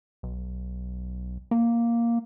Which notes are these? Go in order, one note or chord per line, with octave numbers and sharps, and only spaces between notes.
B1
A#3